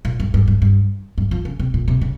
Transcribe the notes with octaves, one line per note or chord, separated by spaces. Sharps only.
A#2
G2
G2
G2
G2
G2
F3
C#3
C3
A#2
C3
C#3